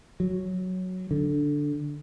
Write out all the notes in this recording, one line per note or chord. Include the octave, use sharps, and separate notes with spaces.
F#3
D3